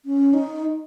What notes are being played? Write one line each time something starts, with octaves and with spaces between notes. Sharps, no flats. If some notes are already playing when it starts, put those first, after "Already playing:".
C#4
D#4